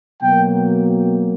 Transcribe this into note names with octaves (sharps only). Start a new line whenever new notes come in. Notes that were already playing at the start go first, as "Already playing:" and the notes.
B2 F#3 A#3 G5